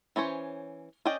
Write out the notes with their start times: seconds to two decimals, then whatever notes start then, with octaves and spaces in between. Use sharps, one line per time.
0.16 E3 C#4 C5 C#5
1.05 C#4 G#4 D5 D#5 G5